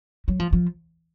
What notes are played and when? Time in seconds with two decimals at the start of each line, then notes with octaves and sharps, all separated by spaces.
0.28 F#3
0.40 F3
0.53 F3